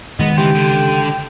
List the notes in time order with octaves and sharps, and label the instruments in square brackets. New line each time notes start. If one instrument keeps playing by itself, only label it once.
[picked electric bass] D#3 G#3 [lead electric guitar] B3 [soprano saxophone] D#5
[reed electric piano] C#3 G4 C6 [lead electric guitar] E3 [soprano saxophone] G5
[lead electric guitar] D3